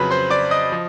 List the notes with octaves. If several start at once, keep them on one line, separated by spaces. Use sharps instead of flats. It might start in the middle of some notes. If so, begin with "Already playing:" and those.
Already playing: F2 C#3 F#3 B4 B5
C5 C6
D5 D6
D#5 D#6
F3